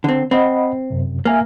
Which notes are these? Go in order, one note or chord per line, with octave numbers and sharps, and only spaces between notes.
D3 C4
C4 D#5 F#5 B5
F#2 C3
A#3 E5 G#5 F6